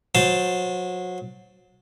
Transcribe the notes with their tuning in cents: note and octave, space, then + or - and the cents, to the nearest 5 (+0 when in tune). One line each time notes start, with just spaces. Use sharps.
F#3 -25 C5 -10 A5 +0